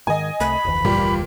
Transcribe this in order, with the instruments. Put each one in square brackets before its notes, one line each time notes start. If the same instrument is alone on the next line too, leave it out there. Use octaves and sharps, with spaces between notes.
[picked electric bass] G#2 D#3 [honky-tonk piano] D#5 G#5
[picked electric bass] C2 A3 [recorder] B5
[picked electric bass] F1 D2 E3
[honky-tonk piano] A#2 [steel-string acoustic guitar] G3